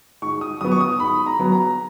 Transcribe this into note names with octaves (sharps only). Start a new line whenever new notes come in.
G#2 C#6
D#6
F#3 B3 D#6
C#6
D#6
G#2 B5
A#5
F#3 B3
A#5